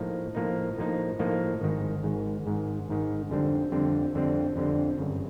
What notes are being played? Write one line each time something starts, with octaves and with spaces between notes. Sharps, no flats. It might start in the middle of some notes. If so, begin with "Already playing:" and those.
Already playing: A2 F3 A#3 D#4
A2 F3 A#3 D#4
A2 F3 A#3 D#4
A2 F3 A#3 D#4
G#1 G#2 D#3
G#1 G#2 D#3
G#1 G#2 D#3
G#1 G#2 D#3
F2 D3 G3 C4
F2 D3 G3 C4
F2 D3 G3 C4
F2 D3 G3 C4
G1 F#2 C#3